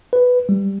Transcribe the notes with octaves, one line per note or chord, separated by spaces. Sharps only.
B4
G3